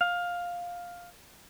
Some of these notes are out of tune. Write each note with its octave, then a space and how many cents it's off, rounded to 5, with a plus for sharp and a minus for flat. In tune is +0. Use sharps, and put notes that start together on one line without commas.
F5 +10